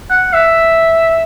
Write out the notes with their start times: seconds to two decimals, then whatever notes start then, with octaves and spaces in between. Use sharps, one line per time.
0.10 F#5
0.33 E5